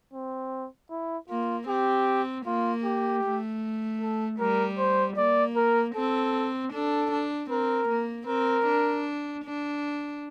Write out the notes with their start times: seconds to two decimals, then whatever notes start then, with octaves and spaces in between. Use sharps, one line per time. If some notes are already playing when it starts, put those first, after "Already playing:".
0.14 C4
0.91 E4
1.29 A#3 F4
1.68 C4 G4
2.46 A#3 F4
2.84 G4
3.24 A3
4.01 A4
4.40 G3 A#4
4.78 C5
5.17 A#3 D5
5.56 A#4
5.95 C4 A4
6.73 D4 A4
7.12 D4
7.51 C4 A#4
7.89 A#3
8.27 C4 A#4
8.67 D4
9.44 D4